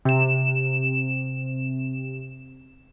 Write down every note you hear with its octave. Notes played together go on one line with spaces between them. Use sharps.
C3 E7